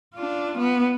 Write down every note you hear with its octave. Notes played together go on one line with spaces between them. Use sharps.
D4 F4
B3